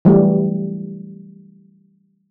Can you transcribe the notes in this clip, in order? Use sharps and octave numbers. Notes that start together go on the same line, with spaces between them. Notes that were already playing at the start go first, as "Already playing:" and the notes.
E3 F#3 G3 A3